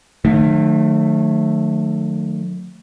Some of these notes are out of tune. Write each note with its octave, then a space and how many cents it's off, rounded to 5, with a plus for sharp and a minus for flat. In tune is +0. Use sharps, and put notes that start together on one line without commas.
D#3 -30 F#3 -45 A3 +0